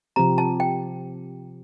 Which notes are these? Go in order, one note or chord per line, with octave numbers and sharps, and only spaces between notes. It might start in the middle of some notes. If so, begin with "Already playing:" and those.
C3 F3 C4 G4 A#5
A5
G5